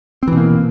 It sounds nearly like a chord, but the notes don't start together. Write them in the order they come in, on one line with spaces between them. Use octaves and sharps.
C4 E3 B2 A#3